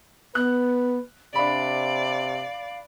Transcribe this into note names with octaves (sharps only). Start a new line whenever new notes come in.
B3 B4 F#6
C3 D4 D5 F5 B5